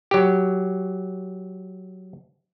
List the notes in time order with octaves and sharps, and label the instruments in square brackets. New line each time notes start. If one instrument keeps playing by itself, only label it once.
[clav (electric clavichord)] F#3 G4